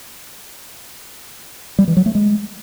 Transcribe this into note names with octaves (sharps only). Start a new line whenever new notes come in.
G3
E3
F#3
A3
G#3